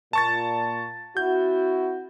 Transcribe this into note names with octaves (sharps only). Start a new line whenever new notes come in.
A#2 A5 C#6 A6
C4 E4 F#4 G6